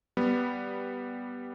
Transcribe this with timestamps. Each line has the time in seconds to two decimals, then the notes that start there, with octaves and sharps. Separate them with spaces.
0.17 G3 B3